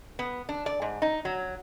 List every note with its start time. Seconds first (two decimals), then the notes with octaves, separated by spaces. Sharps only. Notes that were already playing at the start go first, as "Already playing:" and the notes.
0.19 B3
0.49 D4
0.66 D5
0.82 G#2
1.02 D#4
1.25 F#3